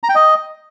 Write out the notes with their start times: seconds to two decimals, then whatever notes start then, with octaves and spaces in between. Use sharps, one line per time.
0.03 A#5
0.09 G5
0.15 D#5